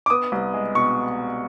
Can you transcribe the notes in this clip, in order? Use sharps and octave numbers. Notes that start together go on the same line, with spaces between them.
D6
B3 D#6
C2
G#3
B2 C#6